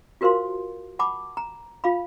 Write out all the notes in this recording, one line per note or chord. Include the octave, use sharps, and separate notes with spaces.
F4 F#4 A#4 C5 F5 C6
F#5 A5 B5 D6
A#5
F4 F5 B5